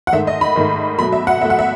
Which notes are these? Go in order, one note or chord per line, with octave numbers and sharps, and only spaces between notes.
F#5
G#2 D#3 A3 E5
D#5
B5
G#2 D#3 A3
B2 F#3 A3 B5
E5
F#5
B2 F#3 A3 E5
F#5
E5